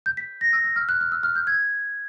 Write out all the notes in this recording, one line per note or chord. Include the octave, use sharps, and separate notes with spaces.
G6
B6
A#6
E6
E6
F6
F#6
F6
E6
F6
G6
G#6